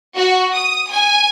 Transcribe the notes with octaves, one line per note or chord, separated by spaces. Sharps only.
F#4
D#6
G#5